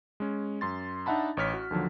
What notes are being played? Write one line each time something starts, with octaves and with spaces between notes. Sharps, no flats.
G#3 C#4
F#2 C6 A6
D4 D#4 E5 F#5 A5 B5
A1 C#5 F6 B6
F#4
D#2 D3 F3 F#3